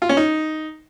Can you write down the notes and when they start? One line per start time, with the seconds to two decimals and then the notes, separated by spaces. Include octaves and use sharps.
0.02 F4
0.09 C#4
0.17 D#4